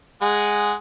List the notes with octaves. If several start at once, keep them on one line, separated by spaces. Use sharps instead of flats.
G#3 G#4 F#5